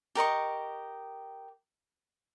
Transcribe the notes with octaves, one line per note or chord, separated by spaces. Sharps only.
G4 A#4 D#5 C#6